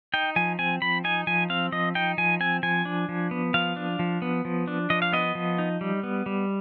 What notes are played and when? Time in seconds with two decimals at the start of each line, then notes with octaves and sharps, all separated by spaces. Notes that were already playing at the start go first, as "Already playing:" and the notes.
0.14 D#4 G5
0.36 F3 G#5
0.59 C4 G#5
0.82 F3 B5
1.04 D#4 G#5
1.27 F3 G#5
1.50 C4 F5
1.72 F3 D#5
1.95 D#4 G5
2.18 F3 G#5
2.40 C4 G#5
2.63 F3 G#5
2.85 D4
3.09 F3
3.31 B3
3.54 F3 F5
3.76 D4
3.99 F3
4.22 B3
4.45 F3
4.68 D4
4.90 F3 D#5
5.02 F5
5.13 B3 D#5
5.35 F3
5.58 D#4
5.81 G3
6.03 B3
6.26 G3